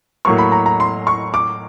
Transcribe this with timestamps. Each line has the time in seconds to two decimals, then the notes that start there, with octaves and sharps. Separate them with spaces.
0.25 A2 F#3 A#3 C#6
0.38 B5
0.52 A#5
0.66 A#5
0.80 C6
1.07 C#6
1.34 D6